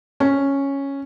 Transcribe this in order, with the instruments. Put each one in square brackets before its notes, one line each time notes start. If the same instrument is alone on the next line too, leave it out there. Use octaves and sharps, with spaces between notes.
[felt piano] C#4